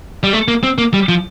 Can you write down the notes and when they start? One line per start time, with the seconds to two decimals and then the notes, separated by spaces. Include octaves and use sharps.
0.23 G3
0.33 A3
0.48 A#3
0.63 C4
0.78 A#3
0.94 G3
1.09 F3